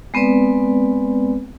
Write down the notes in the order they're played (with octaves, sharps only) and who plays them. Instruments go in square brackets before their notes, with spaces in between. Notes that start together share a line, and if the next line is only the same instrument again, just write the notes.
[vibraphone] G#3 B3 C4 B4 D5